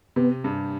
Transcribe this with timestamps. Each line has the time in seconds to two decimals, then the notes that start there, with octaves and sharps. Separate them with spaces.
0.16 C3 B3
0.44 G2